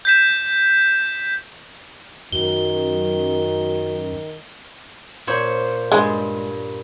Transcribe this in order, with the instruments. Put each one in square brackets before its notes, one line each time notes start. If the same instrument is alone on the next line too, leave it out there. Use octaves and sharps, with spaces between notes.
[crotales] G6 B6 E7
[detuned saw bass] F#2 [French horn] D#3 [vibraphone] F#4 [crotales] G7
[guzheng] A#2 C5 C#5
[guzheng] G2 C6 [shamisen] G#3